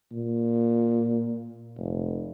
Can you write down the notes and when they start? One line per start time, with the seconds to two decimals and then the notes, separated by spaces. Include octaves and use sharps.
0.12 A#2
1.78 F1